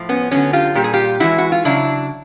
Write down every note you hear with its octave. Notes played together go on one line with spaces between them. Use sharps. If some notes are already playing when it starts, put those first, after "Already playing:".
Already playing: A2 F3
B3 C#4
D3 F#3 B3 C#4
F4 G4
A#2 G3 G4
G#4
F4 G4
A2 E3 G#3 E4 F#4
F#4
F4
C#3 F#3 D4 E4